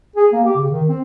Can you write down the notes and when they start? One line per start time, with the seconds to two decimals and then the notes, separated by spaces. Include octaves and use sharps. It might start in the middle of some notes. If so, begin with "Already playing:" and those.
0.16 G#4
0.32 A#3
0.45 G4
0.56 C#3
0.71 D#3
0.89 C4